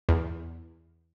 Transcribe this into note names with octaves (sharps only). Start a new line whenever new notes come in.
E2